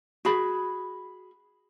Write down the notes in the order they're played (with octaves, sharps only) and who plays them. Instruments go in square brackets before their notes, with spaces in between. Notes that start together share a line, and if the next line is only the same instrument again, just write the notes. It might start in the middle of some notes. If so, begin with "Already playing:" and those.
[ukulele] F#4 G#4 B5